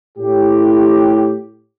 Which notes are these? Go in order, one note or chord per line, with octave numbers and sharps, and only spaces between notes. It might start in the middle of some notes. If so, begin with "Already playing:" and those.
A2 G4